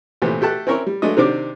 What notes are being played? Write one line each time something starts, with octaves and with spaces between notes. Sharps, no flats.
A#1 C3 E3 A3
A3 G4 A4 A5 F#6
C4 C#4 E4 A#4 C#5
G3
F#3 G#3 A3 D4 D#5
C3 D#3 C4 D4 D5 D6